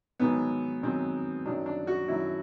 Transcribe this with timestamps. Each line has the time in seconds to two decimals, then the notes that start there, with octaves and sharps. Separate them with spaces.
0.20 G#2 D#3 F#3 B3
0.82 G#2 D#3 F#3 C4
1.46 F#2 D#3 F#3 D4
1.66 D4
1.87 F#4
2.08 F#2 D#3 F#3 E4